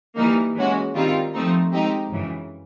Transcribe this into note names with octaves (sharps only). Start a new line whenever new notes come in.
E3 G3 A#3 D#4
E3 G#3 C#4 F#4
D#3 G3 C4 F4 A#4
F3 A3 C4 D#4
G#3 C4 D#4 G4
F#2 C#3 E3